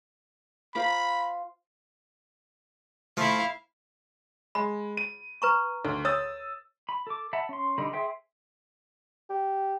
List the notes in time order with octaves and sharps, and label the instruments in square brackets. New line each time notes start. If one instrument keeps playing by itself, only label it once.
[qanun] F4 C5 D6 [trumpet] B5
[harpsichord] F3 A3 [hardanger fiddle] E4 F5
[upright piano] G#3 [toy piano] B5
[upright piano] D#7
[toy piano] B4 A#5 C#6
[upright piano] D2
[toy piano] C#5 [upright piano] D#6 E6 A6
[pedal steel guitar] B5
A4 D6
E5 F#5 A5 B5
C#4 C6
D3 G3 D#4 B5
G#4 C5 E5 G5 C6
[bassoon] G4